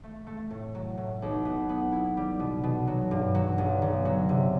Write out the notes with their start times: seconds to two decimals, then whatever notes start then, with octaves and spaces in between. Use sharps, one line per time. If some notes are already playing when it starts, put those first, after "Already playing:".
0.03 A3
0.27 A3
0.50 A2
0.75 F#3
0.97 A2
1.22 B1
1.45 B3
1.69 B3
1.92 E4
2.17 G3
2.40 B2
2.64 B2
2.87 F#3
3.11 G2
3.35 F#3
3.58 G1
3.82 G1
4.05 F#3
4.29 C3